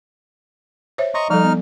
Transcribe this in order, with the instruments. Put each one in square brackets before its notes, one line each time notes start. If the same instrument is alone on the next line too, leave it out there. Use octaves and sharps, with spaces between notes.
[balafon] C5 C#5 E5
[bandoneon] D#5 A#5 C#6 [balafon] C6
[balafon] F3 G3 A4 [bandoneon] D#4 F6
[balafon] B3